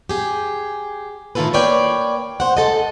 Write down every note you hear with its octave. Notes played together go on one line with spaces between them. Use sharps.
G4 G#4
A2 D#3 E4 F4 A4 B4
A#3 B4 C#5 D5 G5
C5 F#5
D2 F3 A4 D#5